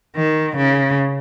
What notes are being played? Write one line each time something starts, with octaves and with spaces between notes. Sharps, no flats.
D#3
C#3